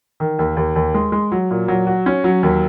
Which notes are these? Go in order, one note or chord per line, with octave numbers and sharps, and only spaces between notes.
D#3
D#2
D#2
D#2
G#3
G#3
F#3
A#2
F#3
F#4
C#4
F#3
D#2